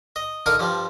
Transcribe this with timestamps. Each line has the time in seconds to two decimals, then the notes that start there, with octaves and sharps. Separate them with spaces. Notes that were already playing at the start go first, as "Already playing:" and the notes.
0.16 D#5
0.46 D3 D#4 A#4 F5 D#6
0.59 G2 F3 G3